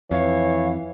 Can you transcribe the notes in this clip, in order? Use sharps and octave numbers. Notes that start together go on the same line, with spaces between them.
F2 E3 C#5 F5